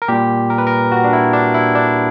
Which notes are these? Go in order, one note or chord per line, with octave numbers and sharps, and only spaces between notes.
A#4
A#2 G3 G4
A#4
B4
A#4
F#4
D4
E4
D4
E4
D4